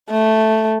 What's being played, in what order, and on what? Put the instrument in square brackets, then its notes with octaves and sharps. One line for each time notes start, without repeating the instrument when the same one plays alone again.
[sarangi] A3